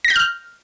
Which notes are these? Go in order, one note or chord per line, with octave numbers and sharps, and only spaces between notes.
A#6
G6
F6